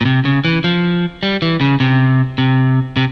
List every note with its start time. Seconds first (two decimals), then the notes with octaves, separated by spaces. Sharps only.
0.01 A#2
0.05 C3
0.25 C#3
0.45 E3
0.64 F3
1.23 G3
1.42 E3
1.61 C#3
1.80 C3
2.38 C3
2.97 C3